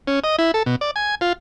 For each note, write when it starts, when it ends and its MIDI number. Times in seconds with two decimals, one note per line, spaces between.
0.07 0.20 61
0.24 0.36 75
0.39 0.51 64
0.54 0.63 69
0.66 0.76 47
0.81 0.91 74
0.96 1.15 80
1.21 1.33 65